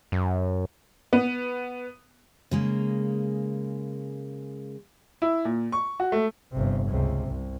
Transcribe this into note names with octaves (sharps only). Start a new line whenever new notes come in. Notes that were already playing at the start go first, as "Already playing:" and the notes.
F#2
B3
C#3 G#3 A#3
E4
A#2
C#6
F#4
A3
G1 C3
C#2 C3
C2